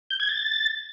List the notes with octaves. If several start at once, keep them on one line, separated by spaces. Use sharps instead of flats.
G6
G#6
A6